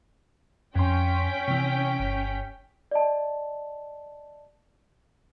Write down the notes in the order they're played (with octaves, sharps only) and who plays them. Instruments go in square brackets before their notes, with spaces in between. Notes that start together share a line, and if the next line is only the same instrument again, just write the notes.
[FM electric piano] F2 C6 [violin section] C#4 G5 B6
[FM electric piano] C3 E3
G1
[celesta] D5 D#5 A5